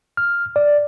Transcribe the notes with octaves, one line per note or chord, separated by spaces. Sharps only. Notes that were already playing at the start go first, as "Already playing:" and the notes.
F6
D5